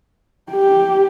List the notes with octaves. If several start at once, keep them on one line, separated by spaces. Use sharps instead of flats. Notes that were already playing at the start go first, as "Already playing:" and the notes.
G4